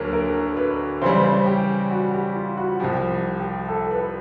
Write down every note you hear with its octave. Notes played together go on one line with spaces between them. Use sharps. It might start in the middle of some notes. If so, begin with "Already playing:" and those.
Already playing: D2 D3 F#3 A#3 G#4 A#4
A#4
B4
C#3 E3 G3 C5
C5
G4
F#4
G4
F4
F#4
C2 C3 F3 G4
G4
A4
B4